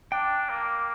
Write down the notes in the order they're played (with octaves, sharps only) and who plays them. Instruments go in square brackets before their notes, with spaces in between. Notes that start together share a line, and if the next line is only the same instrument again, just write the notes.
[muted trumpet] D4 [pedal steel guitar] G5
[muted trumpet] A#3